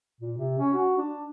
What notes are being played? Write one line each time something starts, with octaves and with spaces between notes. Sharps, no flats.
A#2
C3
C#4
F#4
D4